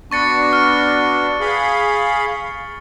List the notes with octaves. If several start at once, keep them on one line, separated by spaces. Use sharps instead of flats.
B3 D4 F#4 C#6 A6 C#7
F6
G#4 F5 B5